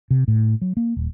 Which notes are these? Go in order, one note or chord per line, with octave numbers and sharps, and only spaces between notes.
C3
A2
F#3
A#3
D#1